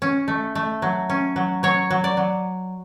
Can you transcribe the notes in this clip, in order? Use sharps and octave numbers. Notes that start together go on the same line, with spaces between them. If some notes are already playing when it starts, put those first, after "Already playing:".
C#4
A3
A3
F#3
C#4
F#3
F#3 C#5
F#3
D5
F#3